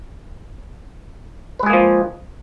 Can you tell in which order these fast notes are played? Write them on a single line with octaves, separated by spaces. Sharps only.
B4 G#3 G#4 A#3 F3